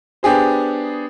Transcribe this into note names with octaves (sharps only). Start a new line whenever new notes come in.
B3 D4 G4 G#4 C5